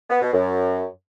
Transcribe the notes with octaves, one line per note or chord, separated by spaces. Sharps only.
B3
B2
F#2